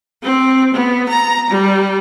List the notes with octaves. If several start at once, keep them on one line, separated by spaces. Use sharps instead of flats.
C4
B3
A#5
G3